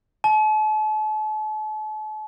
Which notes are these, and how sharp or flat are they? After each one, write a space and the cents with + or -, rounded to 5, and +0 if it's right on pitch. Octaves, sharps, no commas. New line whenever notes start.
A5 -40